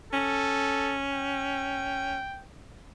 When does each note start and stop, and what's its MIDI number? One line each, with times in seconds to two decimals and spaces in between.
0.13 2.19 61
0.13 0.96 69
1.12 2.44 79